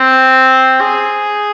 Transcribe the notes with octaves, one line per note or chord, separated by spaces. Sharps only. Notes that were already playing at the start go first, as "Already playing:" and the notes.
Already playing: C4
G#4